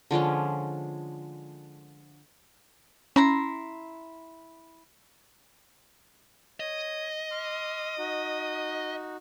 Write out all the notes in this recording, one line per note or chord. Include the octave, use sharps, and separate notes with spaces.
D3 F3 G#3 C#4
C#4 E4 A#5 C6
C#5 D#5
C6 D6 F6
D#4 F#4